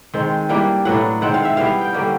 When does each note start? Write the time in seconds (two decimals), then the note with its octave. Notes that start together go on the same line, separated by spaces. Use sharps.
0.14 D#3 G#3 C4
0.49 E3 G3 A#3 D4
0.85 A2 F#3 B3 D4 F#5
1.21 D#3 G#3 C4 F#5
1.34 F5
1.45 E5
1.57 E3 G3 B3 F5
1.81 G5
1.93 D3 G3 A#3 C#4